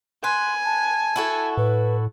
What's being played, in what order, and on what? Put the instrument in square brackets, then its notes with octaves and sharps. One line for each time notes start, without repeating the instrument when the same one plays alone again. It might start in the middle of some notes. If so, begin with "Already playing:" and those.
[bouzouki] B4 [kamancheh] G#5 [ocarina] C6
[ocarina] A5
[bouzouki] E4 F#4 A4
[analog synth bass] A2 [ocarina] B4